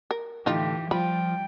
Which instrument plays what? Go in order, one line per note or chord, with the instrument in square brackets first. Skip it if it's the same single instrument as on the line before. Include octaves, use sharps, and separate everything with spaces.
[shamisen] A#4
[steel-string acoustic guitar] A2 D3 [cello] E3 G4 [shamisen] D#4 F4
[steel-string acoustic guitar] F3 F4 [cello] G3 G5 [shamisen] B5